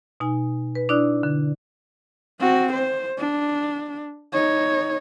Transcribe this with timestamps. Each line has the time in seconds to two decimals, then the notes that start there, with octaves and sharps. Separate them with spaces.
0.20 B2 D#4 G#5
0.75 B4
0.89 D4 E4 D5 D#6 F#6
1.23 D3
2.40 C4 F#4
2.73 C5
3.18 D4
4.33 D#4 C#5